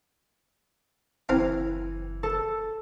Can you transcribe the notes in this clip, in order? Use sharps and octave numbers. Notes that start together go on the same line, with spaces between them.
F#1 E3 C4 A#4 F5
A4